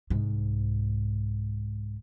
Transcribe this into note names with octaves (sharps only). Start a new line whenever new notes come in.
C2 G#2